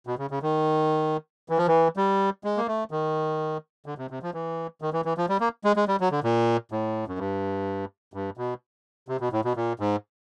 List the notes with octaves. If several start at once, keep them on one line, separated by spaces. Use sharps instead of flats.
B2
C#3
C#3
D#3
E3
F3
E3
G3
G#3
A#3
A3
D#3
D3
C3
C3
F3
E3
D#3
E3
E3
F3
G3
A#3
G#3
G#3
G3
F#3
D3
A#2
A2
F#2
G2
G2
B2
C3
B2
A2
B2
A#2
G#2